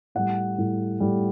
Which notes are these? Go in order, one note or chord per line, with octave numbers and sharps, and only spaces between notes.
A2 G3 F#5
A2 G3
A2 G3